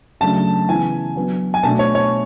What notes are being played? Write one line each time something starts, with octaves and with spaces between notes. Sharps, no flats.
C#3 F#3 A3 D4 A5
C#3 E3 B3 G#5
F#3 B3 D4
G#5
B2 A3 D4 A5
C#5
C#5